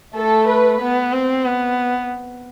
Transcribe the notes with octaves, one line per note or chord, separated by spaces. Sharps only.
A3 A4
B4
B3
C4
B3